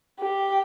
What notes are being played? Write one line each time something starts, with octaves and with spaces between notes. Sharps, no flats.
G4